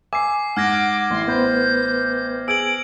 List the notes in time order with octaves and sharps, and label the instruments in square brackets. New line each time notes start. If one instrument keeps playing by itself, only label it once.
[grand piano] G#5 E6 [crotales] D6 C7
[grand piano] G#2 [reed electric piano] F#5 [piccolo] D6 [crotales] F6 G#6 A#6
[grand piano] A1 [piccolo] C6
[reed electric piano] B3 B4 C5 [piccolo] G6
[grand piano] G#4 [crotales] E6 G#6 F#7 [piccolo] D7